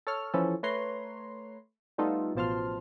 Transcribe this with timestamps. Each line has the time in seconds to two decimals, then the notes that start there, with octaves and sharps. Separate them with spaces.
0.07 A4 C#5 F6
0.34 E3 F3 C#4 E4 A4
0.63 A3 B4 C#5 A#5 C6
1.98 G3 A3 B3 D#4 F4 A4
2.35 A1 B2 F3 A5 C6 F6